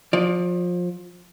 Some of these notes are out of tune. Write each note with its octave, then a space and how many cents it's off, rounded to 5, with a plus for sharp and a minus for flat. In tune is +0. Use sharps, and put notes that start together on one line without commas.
F3 +25 D5 +0